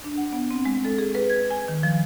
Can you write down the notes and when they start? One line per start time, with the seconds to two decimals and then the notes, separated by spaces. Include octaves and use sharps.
0.04 D4
0.17 F#5
0.33 B3
0.51 C4
0.66 G#3
0.85 A4
0.99 G#4
1.15 B4
1.30 G#6
1.50 G#5
1.68 D#3
1.83 F3